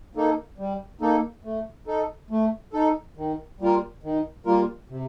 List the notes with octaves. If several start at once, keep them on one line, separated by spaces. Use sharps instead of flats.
A#3 D#4 A4
G3
A#3 D#4 A4
A3
D#4 A4
A3
D#4 A4
D#3
G3 A#3 F4 A#4
D#3
G3 A#3 F4 A#4
C3